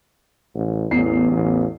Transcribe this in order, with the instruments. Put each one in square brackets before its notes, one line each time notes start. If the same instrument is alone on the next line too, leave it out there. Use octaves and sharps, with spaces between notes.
[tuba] A1
[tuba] A1 [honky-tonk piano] E2 C7
[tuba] A1